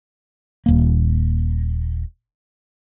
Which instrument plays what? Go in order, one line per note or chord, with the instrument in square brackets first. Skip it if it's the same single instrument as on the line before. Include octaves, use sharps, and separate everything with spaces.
[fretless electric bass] D#1 A#3